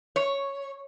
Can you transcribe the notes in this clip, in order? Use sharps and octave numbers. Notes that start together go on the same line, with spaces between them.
C#5